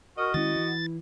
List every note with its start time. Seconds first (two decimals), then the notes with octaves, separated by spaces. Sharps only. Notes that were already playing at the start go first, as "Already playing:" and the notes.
0.18 F#4 A#4 D#5 C#6 F6
0.34 D#3 G#3 C#4 E4 A6
0.56 E3